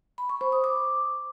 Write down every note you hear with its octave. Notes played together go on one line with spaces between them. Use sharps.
B5
C#6
C5
D#6
D6